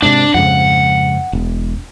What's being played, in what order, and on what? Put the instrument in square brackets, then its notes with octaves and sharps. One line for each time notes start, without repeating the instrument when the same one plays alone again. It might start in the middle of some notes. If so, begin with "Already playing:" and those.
[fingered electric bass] G#2 C3 [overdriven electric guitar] D4
[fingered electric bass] F2 G#2 C#3 [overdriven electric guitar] F#5
[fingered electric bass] E1